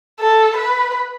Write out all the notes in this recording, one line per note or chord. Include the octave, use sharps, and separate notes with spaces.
A4
B4